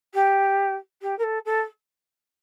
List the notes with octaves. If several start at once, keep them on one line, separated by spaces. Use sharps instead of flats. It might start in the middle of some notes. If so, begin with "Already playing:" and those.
G4
G4
A#4
A4
A4